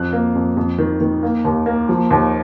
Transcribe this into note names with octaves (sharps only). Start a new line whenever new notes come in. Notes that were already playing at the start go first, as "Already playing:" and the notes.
Already playing: F2 F#6
A#3
F2
F2
D#3
D#3
A#3
D#2
A#3
F3
D#2